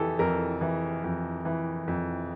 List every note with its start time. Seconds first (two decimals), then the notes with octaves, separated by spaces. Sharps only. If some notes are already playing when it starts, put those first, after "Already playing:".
Already playing: F2 E3 G4 A4
0.19 F2 A#4
0.61 E3
1.04 F2
1.45 E3
1.88 F2